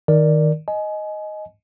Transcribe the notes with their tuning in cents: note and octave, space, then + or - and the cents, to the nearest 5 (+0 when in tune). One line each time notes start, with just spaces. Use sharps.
D#3 +0 A#4 +0 D5 +5
D#5 +0 G#5 +25